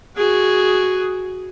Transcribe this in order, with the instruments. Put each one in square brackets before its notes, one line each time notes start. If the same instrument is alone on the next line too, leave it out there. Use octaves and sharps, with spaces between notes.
[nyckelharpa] F#4 G#4